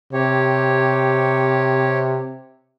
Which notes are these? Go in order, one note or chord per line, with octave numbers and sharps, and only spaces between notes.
C3 G4 C#5